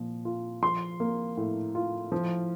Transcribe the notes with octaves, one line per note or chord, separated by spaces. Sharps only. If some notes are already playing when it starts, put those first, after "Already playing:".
Already playing: A#2 F3
F4
F3 C6
A#3
A2
F4
F3